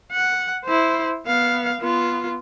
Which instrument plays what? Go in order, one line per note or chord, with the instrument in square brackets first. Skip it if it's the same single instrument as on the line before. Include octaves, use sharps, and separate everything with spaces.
[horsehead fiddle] F#5
E4 C5
B3 F5
B3 F4